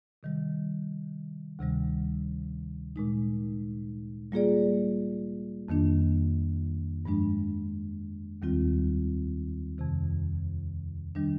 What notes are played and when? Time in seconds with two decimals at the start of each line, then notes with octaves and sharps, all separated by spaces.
0.23 C3 D#3 G3
1.59 D2 C3 D#3 G3
2.96 A#2 G#3 D#4
4.32 G3 A#3 F4 G#4 D5
5.68 F2 D#3 A#3 D4
7.05 G2 F3 G#3 D4
8.42 D#2 D#3 G3 C4 F4
9.78 F2 C3 D#3
11.15 D#3 G3 D4